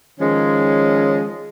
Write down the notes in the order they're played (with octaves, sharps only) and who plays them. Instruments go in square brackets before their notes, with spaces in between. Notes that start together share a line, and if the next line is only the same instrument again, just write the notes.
[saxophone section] D#3 F3 G#3 C#4